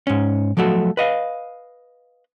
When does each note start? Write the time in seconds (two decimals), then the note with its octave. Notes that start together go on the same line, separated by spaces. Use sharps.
0.07 G#2 C#4
0.57 F3 F#3 A3 F#4 A4
0.97 B4 D#5 F5